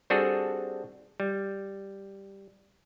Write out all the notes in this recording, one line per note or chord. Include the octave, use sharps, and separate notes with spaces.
G3 C4 D4 F#4 G#4 A4
G3